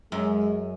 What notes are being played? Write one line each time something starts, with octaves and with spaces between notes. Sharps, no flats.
F#2 G#3